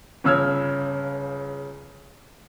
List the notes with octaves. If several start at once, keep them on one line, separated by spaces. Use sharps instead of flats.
G1 C#3 E6 F6 G#6